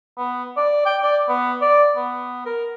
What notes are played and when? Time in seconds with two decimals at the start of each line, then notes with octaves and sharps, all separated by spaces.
0.18 B3
0.57 D5
0.86 G5
1.03 D5
1.29 B3
1.62 D5
1.96 B3
2.46 A#4